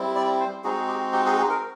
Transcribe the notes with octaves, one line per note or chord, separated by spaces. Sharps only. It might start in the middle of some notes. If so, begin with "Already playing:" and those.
Already playing: G3 C4 E4
D5
C5
G#3 C4 D#4 F#4 G#4
G4
G4
G#4
G#4
A#4